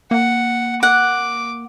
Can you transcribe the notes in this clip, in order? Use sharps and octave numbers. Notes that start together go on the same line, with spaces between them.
A#3 F#5
F#5 D6